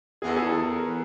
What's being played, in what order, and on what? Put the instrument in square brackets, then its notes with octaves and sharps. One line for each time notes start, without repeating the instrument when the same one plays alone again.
[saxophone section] E2 [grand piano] G#4
[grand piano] A4
G#4
A4
[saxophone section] E2
[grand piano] A#4
B4